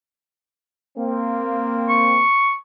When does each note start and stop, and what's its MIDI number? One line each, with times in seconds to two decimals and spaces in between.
0.98 2.24 58
0.98 2.24 60
1.89 2.55 85